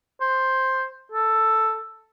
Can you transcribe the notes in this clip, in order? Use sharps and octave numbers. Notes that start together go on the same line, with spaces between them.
C5
A4